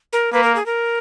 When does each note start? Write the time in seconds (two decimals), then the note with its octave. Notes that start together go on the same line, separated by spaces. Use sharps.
0.13 A#4
0.33 A#3 B4
0.44 A#4
0.55 G#4
0.66 A#4